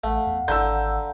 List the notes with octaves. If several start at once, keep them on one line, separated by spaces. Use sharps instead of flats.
A1 A3 F5 F#5
E2
G#1 D3 F5 F#5 A#5 E6 G6